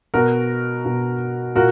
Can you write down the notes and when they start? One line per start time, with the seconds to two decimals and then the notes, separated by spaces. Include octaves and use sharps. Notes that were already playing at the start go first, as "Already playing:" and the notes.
0.14 B2 F#4 A#4
0.85 B2
1.55 A#2 F#4 A#4